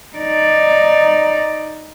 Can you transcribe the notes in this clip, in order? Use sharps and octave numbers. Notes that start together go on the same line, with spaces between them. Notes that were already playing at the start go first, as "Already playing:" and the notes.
D#4 D5